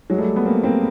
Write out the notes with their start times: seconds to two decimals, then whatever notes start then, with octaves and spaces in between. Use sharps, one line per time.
0.10 F#3 G#3
0.18 G3 A3
0.36 A3 B3
0.45 A#3 C4
0.64 A#3 C4